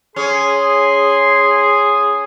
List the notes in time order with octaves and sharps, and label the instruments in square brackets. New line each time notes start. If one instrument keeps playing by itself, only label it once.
[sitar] C#4 [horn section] G#4 [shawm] C6